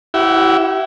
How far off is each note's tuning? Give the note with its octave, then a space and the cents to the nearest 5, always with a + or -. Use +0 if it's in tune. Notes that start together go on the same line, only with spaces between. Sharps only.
E4 +0 G4 -40 F#5 +0